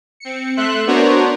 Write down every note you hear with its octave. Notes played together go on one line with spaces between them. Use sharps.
C4 C#7
A3 E5 C6 F#6
B3 D4 F#4 A#4 C5 C#5